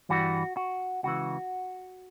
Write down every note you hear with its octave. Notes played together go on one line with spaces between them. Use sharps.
G2 E3 G3 F#4
F#4
C#2 C#3 E3 F#4